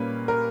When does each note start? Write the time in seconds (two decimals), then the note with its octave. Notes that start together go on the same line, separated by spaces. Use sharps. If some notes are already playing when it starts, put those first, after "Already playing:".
Already playing: A#2 G3 A#3 C#4 B4
0.28 A#4